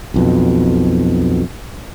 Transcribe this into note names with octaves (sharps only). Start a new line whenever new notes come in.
B1 F2 B2